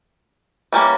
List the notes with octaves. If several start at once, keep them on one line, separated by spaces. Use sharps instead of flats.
E3 G3 A#3 C#4